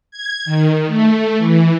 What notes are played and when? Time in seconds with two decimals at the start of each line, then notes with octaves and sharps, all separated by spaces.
0.11 G#6
0.45 D#3
0.87 A3
1.38 E3